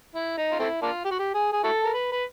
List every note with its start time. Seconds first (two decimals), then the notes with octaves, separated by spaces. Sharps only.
0.15 E4
0.37 D#4
0.52 F4
0.59 A3 C4 E4
0.82 A#3 D4 F4
1.05 G4
1.11 F#4
1.19 G4
1.34 G#4
1.52 G#4
1.64 E4 F#4 A4
1.84 A#4
1.94 B4
2.12 B4